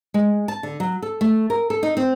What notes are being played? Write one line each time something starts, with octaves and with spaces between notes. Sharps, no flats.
G#3
A5
D3
F#3
A4
A3
A#4
A4
D#4
C4